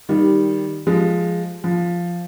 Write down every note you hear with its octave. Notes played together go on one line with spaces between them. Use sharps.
D#3 G3
F3 G#3
F3